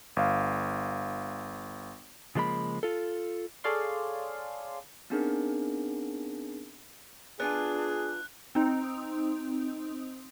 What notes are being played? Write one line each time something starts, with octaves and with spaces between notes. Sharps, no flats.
G1 F5
C#3 F3 G#3 A#3 B5
F4 A4
G#4 A4 C#5 D5 F5 C6
B3 C4 D4 D#4 G#4 A#4
B3 D4 F4 G#4 G#5 F#6
C4 D#4